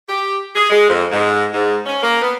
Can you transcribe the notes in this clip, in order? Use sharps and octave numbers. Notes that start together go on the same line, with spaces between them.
G4
G#4
G#3
F2
G#2
G#2
C#4
A#3
B3